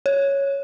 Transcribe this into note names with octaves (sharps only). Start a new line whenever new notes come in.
C#5